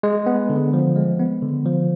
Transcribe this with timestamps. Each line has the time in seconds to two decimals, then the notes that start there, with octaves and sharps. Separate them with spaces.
0.03 G#3
0.26 B3
0.50 D3
0.73 F3
0.96 G#3
1.19 B3
1.42 D3
1.65 F3